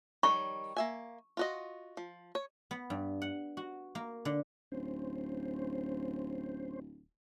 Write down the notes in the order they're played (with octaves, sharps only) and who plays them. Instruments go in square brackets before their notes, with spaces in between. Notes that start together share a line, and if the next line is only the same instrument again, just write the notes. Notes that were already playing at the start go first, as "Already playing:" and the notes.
[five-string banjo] D#3 G3 C#5 [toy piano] C#6
[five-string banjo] A#3 E5 G#5
F4 F#4 D#5
F3
C#5
[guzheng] B3
G2
F#5
F#4
A#3
D3
[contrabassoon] D1 [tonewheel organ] C#4 C5